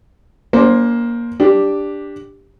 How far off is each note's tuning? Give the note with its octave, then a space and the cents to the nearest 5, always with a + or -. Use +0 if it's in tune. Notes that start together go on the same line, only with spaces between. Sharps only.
A#3 +15 D4 -45 C5 +5
D4 +0 G4 +5